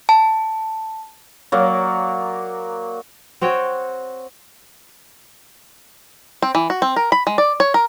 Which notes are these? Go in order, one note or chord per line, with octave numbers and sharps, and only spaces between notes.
A5
F#3 A#3 D5
C4 F#4 C#5 G5
C4
E3
F#4
C4
A#4
B5
G#3
D5
C#5
A#4